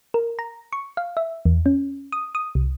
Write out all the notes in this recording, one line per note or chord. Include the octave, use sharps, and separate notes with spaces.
A#4
A#5
C#6
F5
E5
E2
C#4
D#6
D#6
C2